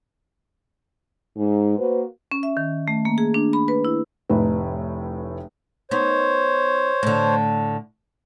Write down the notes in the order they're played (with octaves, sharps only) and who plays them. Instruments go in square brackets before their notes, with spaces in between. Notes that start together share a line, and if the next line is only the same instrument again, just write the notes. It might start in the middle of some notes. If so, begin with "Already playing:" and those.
[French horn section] G#2
A#3 F#4 B4 C5
[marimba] C#4
E5
D#3
A3
A#3
G#4
D4
B5
B4
E4
[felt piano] F1 A2 B4
[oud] B3 D#4 [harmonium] C5 C#5
[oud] A2 D3